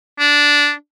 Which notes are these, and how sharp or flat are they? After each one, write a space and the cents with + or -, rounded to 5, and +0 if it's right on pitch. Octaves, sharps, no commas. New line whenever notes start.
D4 -10